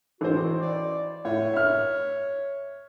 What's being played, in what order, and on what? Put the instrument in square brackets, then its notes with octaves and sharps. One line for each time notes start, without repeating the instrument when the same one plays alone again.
[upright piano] A1 C5 [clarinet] F#4
[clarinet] D5
[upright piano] A2 [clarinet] C#5
[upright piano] E5 F6